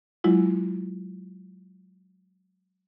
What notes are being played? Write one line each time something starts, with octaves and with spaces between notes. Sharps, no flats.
F#3 G#3 E4 F4